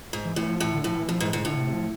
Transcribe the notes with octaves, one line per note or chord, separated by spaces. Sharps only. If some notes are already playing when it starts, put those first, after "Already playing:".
G#2
E3
A2 E3
F3
A2 E3
D3
A2 F3
E3
F2 F3
G#2 E3
G#2 D3
A2 D3
C3
F3